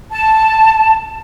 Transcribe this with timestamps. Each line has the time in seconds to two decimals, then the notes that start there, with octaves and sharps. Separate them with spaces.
0.11 A5